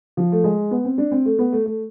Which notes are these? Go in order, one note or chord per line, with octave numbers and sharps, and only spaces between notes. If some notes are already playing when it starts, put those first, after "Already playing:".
F3
A3
G#3
B3
C4
D4
C4
A3
B3
A3
A3